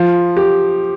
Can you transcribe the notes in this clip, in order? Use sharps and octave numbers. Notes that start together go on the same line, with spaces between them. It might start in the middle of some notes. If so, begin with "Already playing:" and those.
Already playing: F3
G4